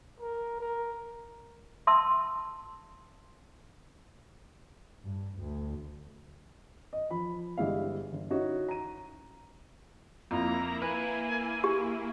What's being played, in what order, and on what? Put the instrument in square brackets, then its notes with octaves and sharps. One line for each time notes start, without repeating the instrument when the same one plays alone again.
[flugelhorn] A#4
A#4
[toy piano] E5 A5 C6 D#6 E6
[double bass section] G2
D2
[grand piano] D#5
F3 B5
G1 G3 G#3 E4 F5
G1
C#4 D#4 E4 F#4
A#5 D#7
[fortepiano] F2 [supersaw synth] A#3 E4 [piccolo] A#5
[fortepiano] B4 [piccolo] G#5
[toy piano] G4